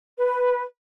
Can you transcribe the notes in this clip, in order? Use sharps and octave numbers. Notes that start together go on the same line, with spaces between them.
B4